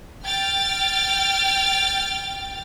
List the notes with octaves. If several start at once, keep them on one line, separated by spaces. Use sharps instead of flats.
G5 F6 A6